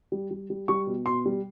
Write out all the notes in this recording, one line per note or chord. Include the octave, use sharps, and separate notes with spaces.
G3
G3
G3
G3 C#6
B2
B2 C6
G3